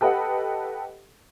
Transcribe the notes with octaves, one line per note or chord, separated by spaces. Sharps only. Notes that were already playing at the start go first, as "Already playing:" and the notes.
G4 A4 B4 D#5 F#5